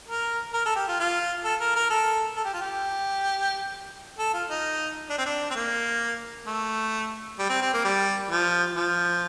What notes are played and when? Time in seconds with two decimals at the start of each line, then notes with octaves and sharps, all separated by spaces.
0.08 A#4
0.53 A#4
0.66 A4
0.76 G4
0.88 F4
1.00 F4
1.44 A4
1.60 A#4
1.76 A#4
1.90 A4
2.37 A4
2.45 G4
2.53 F4
2.61 G4
4.19 A4
4.34 F4
4.50 D#4
5.10 D4
5.18 C4
5.25 D4
5.51 C4
5.56 A#3
6.47 A3
7.39 G3
7.49 C4
7.62 C4
7.73 A#3
7.84 G3
8.31 F3
8.75 F3